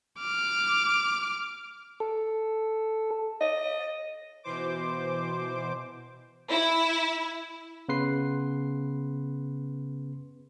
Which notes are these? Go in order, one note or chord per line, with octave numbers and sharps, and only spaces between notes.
D6 F6
A4
D#5
B2 E3 C5 D6
E4
C#3 B3 B4 C6 C7